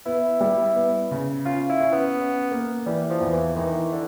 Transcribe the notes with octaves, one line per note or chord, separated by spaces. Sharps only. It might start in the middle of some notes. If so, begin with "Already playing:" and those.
B3 E4
G3
B3
C#3
C#4 F4
E4
C#4
B3
C#4
A#3
E3 G3
F3
E2
E3
D#3 E3
D3